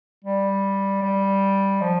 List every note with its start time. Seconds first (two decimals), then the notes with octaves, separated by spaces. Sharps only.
0.25 G3
1.03 G3
1.82 F3